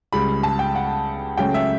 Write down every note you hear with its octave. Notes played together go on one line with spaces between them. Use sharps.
C#2 C#3 G3 B5
A5
G5
F#5
C#2 C#3 F#3 A3 C#4 G5
E5